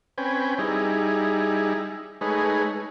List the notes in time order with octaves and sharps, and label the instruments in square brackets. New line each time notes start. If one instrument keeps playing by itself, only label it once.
[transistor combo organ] C4 C#4 B4 G5 G#5
G3 D#4 E4 G#4
G#3 A3 D#4 G#4 B4 C#5